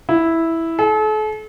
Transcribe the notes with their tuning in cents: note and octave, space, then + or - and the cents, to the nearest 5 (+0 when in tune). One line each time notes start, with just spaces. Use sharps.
E4 -5
A4 -40